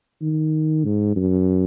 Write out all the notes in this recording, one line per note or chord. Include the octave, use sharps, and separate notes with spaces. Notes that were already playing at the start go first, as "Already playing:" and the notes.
D#3
G#2
F#2